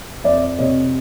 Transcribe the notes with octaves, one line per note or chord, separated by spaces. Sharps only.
F2 D5 E5
C3 C#5 D#5